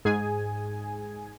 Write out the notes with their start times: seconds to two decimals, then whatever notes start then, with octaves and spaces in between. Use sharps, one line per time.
0.05 G#2 G#4 G#5